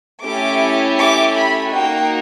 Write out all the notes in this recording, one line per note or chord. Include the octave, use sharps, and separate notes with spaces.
A3 C#4 E4 G4 D6
D6
B5
A#3 D#4 F#4 G5